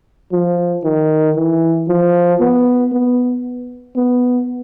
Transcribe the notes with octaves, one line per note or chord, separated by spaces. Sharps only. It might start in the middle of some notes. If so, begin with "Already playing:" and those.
F3
D#3
E3
F3
B3
B3
B3